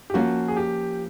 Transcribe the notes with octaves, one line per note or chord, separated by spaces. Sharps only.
G4
F3 A#3 C#4 F4 F#4
G#4
G4